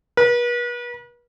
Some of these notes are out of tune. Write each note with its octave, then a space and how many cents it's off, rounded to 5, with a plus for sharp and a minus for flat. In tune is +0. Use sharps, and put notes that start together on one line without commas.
B4 -40